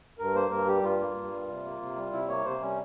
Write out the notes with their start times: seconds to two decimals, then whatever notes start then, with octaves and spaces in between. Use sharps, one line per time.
0.19 G2 A#4
0.35 A#3 C5
0.51 G2 A#4
0.67 G3 G4
0.83 G2 F4
1.00 A#3
1.15 G2
1.31 G3
1.49 C3
1.65 A#3
1.81 C3
1.96 G3
2.12 C3 E4
2.28 A#3 C#5
2.45 C3 C5
2.61 G3 C#4